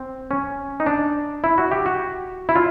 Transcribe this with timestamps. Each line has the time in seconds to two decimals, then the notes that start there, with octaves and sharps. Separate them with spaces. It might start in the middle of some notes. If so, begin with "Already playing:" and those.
Already playing: C4
0.31 C#4
0.80 D#4
0.86 D4
1.44 E4
1.58 F#4
1.71 G4
1.86 F#4
2.49 E4
2.55 F4